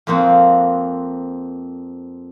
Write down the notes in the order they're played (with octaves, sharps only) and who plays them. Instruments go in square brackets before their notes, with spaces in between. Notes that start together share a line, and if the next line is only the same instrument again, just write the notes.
[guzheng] F2 A#3 C4 F#5